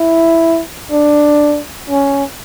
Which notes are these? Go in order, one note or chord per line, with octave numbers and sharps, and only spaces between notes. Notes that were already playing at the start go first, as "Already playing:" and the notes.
Already playing: E4
D4
C#4